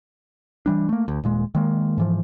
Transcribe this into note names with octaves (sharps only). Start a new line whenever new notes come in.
E3 G3 D4
A3 A#3
D2
D#1 A#2 G#3
D#3 G#3 A#3
G#2 E3 F3